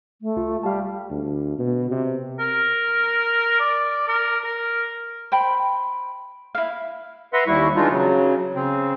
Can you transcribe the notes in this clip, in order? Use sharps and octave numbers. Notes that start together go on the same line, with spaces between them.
A3
C2 F4
G3 F5 A5
D2
B2
C3
A#4
D5
A#4
A#4
C5 G5 B5 C6
E4 F5
B4 E5 F#5 A#5 C6
D#2 G3 E4 C#6
E3 G#3 D4 D#4 F4
C#3 F#3
C#3 C4